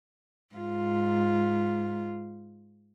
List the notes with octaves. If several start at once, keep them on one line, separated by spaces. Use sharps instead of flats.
G#2 F4